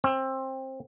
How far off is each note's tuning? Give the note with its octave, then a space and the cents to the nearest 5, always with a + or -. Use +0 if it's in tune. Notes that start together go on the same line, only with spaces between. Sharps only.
C4 +20